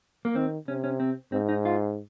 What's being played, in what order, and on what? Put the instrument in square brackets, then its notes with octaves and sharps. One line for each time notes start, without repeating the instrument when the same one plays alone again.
[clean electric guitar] A#3
[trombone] D#3 [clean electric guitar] C4
[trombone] C3 [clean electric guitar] C#4
[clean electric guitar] C#4
C4
[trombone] G#2 [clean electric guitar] C4
[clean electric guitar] D#4
F4